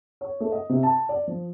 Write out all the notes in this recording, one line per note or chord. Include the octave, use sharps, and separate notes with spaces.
C#5
A3
D#5
C3
A5
D5
F3